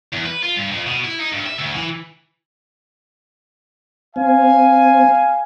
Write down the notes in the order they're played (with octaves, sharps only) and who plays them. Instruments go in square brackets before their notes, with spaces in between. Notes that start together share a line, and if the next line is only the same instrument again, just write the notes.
[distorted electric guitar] E2
B4
F4
G2
F2
B2
E4
D#4
G2
E5
D2
E3
[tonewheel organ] C4 [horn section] F5 G#5